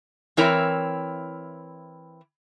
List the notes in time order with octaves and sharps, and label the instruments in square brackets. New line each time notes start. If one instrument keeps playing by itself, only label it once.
[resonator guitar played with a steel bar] E3 C4 E4 A#4 C#5